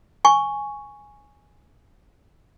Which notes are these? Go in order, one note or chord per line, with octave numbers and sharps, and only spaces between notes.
G#5 C#6